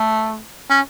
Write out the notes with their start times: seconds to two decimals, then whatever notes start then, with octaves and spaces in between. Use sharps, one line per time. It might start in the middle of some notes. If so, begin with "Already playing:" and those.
Already playing: A3
0.70 C#4